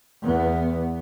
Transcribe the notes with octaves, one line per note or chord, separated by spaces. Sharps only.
E2 B3